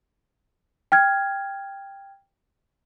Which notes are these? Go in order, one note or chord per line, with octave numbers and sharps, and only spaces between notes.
G5 F6 G#6